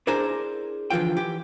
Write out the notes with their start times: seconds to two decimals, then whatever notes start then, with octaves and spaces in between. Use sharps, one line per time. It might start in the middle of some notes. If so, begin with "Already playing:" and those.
0.07 D4 E4 G#4 A#4 C5 A#5
0.90 D3 E3 F3 F4 G5
1.17 E3 G4